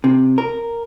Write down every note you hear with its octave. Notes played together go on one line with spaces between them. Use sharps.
C3
A#4